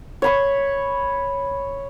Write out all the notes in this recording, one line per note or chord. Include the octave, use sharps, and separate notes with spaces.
C#5 B5 C#6